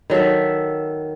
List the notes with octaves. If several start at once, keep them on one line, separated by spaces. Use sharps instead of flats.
D#3 F#3 A4 E5